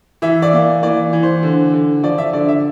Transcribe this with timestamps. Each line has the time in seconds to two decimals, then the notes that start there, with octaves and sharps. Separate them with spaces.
0.22 E3 E5
0.42 D5
0.53 A#3
0.83 E3 D5
1.13 E3
1.23 C5
1.43 D3
1.73 D3
2.03 F3 D5
2.18 E5
2.33 D3 D5
2.48 E5